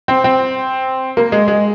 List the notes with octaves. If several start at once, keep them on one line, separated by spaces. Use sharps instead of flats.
C4
C4
A#3
G#3
G#3